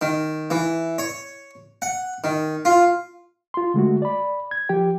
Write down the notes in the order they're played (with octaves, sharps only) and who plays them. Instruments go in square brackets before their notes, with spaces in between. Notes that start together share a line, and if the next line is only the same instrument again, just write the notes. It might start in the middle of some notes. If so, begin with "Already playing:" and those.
[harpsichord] D#3
E3
C#5
F#5
D#3
F4
[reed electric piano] F4 C6
D3 G#3 A3 F#4
D5 B5
G#6
F3 G4 G5